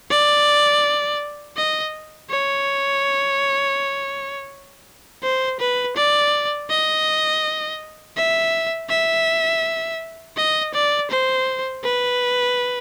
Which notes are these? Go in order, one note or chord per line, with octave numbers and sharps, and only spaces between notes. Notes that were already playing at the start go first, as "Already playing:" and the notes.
D5
D#5
C#5
C5
B4
D5
D#5
E5
E5
D#5
D5
C5
B4